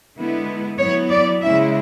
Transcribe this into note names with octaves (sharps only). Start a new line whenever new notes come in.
D3 G#3 B3 E4
F#3 B3 E4 C#5
D5
C#3 G#3 C#4 E4 E5